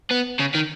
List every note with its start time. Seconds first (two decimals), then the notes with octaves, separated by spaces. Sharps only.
0.11 B3
0.40 C#3
0.55 D#3